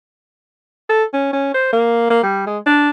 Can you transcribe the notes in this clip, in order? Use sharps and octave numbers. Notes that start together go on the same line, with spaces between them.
A4
C#4
C#4
C5
A#3
A#3
G3
G#3
D4